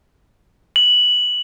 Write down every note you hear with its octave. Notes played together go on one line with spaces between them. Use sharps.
F#7